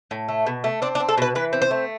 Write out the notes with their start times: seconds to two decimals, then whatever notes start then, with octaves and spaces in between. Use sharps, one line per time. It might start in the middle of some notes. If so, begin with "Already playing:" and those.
0.11 A2
0.28 A3
0.46 B2
0.64 A3
0.82 C4 D4
0.95 D4
1.00 C4
1.09 A4
1.18 B2 B4
1.35 E3 B4
1.53 C4
1.62 C5
1.71 A3